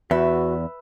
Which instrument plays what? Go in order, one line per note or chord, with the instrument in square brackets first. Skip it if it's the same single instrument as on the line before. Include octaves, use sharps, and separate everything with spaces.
[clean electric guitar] E2 [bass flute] F#4 [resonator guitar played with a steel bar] B4 E5